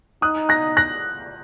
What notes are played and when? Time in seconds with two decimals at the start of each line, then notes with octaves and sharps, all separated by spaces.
0.22 D#4 D#6 F#6
0.49 F#6 A#6
0.77 F#6 A#6